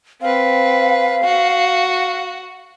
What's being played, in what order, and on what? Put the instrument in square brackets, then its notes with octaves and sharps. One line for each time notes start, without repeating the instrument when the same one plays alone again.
[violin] C4 B4 [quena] F5
[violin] F#4